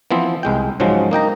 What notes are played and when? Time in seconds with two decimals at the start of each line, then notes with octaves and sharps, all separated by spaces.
0.11 E3 F3 B3 C4
0.43 C2 G#3 G5
0.80 G#2 C#3 F3 F#3 G#3
1.11 A#3 D#4 G5 A#5